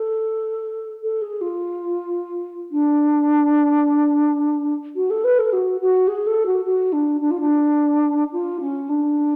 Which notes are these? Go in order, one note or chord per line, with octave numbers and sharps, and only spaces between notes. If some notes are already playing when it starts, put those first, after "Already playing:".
Already playing: A4
A4
G#4
F4
D4
F#4
A4
B4
A4
F#4
F#4
G#4
A4
F#4
F#4
D4
D4
F4
D4
F4
C#4
D4